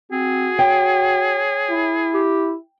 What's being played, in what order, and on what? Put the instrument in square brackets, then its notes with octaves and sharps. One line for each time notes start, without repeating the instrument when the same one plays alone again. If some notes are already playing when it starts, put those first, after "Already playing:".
[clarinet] C4 [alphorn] F#4 [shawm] G#4
[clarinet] C#5 [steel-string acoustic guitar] G5
[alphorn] E4
[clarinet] G4